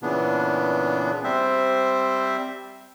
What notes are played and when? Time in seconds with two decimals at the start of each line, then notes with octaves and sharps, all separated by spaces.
0.02 A#2 C#3 E3 B3 D4
1.24 G3 C4 C5 E5